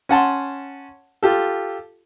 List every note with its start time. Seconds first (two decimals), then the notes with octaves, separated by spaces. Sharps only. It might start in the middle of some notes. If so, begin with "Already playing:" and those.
0.09 C#4 F#5 A5 C6
1.23 F4 G4 A4